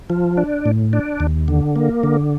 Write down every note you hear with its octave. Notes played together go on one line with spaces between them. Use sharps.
F3
D4
A2
D4
D#2
D3
A#3
D3